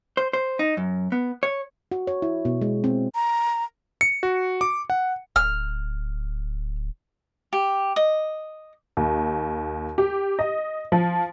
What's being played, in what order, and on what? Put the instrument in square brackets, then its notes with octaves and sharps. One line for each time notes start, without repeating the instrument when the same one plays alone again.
[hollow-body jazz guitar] C5
C5
D#4
F#2
B3
C#5
[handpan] F#4
C#5
E4
B2
G#3
C4
[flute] A#5
[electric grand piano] C#7
F#4
D6
F#5
[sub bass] D1 [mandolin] F6
[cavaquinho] G4
D#5
[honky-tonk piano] D#2
G4
D#5
F3